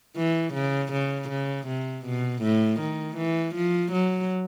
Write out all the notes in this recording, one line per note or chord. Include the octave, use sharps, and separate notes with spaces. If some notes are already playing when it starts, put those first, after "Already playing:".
E3
C#3
C#3
C#3
C3
B2
A2
D#3
E3
F3
F#3